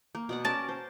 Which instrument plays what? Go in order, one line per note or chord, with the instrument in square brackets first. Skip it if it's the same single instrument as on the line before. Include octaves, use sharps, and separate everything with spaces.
[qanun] A#3
B2 D5 F#5
[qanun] C#4 A#4 D5 [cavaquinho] A5
[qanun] C5